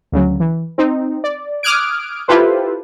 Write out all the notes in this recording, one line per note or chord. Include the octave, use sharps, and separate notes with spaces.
D2 C#3 F#3
E3
C4 D#4
D5
D6 D#6 F6 F#6 G#6 D7
E4 F4 G4 A4 B4 C5